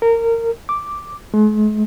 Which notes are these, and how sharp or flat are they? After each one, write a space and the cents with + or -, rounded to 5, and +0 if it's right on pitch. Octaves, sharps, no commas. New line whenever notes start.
A#4 -20
D6 +0
G#3 +45